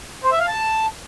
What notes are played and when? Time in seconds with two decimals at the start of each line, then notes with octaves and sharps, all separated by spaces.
0.24 C5
0.32 E5
0.40 F5
0.47 A5